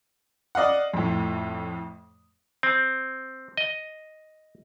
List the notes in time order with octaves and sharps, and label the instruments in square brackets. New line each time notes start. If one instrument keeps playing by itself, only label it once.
[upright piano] D5 D#5 F5 F#5
F2 A2
[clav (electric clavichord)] C4
D#5